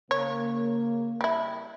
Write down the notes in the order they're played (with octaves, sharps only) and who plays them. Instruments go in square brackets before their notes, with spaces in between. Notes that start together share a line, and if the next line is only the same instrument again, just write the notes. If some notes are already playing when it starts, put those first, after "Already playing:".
[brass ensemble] C#3 A#3 [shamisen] C#5
[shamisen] G3 E4